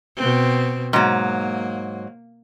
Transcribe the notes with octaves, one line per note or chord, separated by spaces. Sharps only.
B2 C4
G#2 F#3 A#3